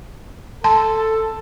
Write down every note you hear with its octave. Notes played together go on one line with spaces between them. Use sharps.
A4 A5 C6